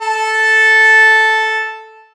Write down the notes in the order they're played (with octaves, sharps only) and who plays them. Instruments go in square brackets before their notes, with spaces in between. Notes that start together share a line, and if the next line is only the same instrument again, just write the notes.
[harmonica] A4 A5